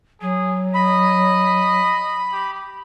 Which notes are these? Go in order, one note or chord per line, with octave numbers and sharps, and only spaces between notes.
F#3 G#4
D#5 B5
G4